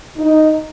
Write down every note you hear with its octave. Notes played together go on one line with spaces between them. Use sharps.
D#4